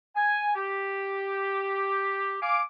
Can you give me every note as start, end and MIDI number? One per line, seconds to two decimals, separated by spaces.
0.15 0.51 80
0.55 2.36 67
2.41 2.59 77
2.41 2.59 80
2.41 2.59 86